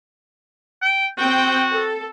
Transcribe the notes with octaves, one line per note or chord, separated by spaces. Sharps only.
G5
C4 F#4 G5
A4